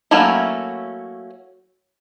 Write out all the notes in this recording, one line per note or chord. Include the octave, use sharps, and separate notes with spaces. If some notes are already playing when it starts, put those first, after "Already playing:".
F#3 A3 A#3 C#4 E4